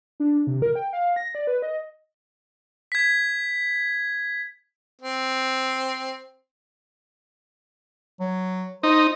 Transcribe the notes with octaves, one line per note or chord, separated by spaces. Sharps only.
D4
C3
A#4
G5
F5
A#6
D5
B4
D#5
G#6 B6
C4
F#3
D#4 C5